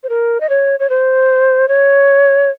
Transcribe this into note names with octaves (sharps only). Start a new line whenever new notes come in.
C5
A#4
D#5
C#5
C#5
C5
C#5